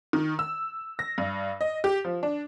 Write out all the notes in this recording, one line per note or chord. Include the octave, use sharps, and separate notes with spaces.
D#3
E6
A#6
G2
D#5
G4
F3
D4